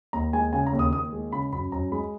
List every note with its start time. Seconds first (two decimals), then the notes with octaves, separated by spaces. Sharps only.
0.13 D#2 A#5
0.33 G#3 G#5
0.53 C#3 G#5
0.67 A#5
0.73 D#2
0.79 D#6
0.93 D#2 D#6
1.13 G#3
1.32 C#3 B5
1.52 F#2 B5
1.72 F#2 A#5
1.92 G#3 B5